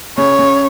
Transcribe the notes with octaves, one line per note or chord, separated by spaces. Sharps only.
C#3 C#5
C#3